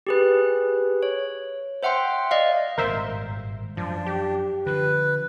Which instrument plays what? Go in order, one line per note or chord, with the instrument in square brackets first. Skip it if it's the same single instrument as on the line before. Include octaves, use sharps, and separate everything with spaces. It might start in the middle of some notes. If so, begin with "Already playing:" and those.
[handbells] G4 G#4 B4
C#5
C5 E5 F#5 G5 C6
D5 D#5 F5
[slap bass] G#1 G2 A#2 [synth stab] A#4 C5 E5
[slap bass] F#2 [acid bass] F3 [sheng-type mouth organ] D4
[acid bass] G4
[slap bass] D3 F3 [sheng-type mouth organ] B4